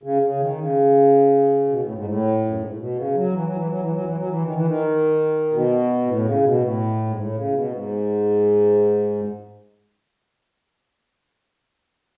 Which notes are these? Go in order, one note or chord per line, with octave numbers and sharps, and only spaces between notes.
C#3
C#3
D#3
C#3
B2
A2
G#2
A2
F#2
G#2
A2
B2
C#3
F#3
E3
F#3
E3
F#3
E3
F#3
E3
F#3
E3
D#3
E3
D#3
B2
A2
C#3
B2
A2
G#2
A2
C#3
A2
B2
G#2